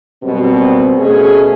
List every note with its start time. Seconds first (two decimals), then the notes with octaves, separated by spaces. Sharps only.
0.23 F#2 B2 G3 C4
0.98 B2 A3 C#4 G#4